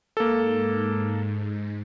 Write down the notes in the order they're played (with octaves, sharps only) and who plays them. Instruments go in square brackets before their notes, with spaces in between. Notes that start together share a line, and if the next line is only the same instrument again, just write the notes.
[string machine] G#2 [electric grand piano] A#3 A4